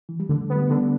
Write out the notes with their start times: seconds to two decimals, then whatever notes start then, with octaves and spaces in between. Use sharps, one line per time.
0.09 E3
0.20 G3
0.29 D3 A3
0.50 B3
0.56 G3
0.70 D3